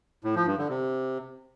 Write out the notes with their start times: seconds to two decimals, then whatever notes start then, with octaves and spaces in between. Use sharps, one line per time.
0.24 A2
0.35 F3
0.47 G2
0.58 D3
0.69 C3